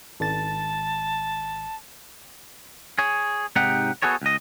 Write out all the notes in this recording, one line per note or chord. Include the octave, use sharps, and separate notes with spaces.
G#1 A5 A6
G#4 C#5
G#2 C3 D#4 G4 F#5
B3 F#4 G#4 A4 C#5
C#2 D#5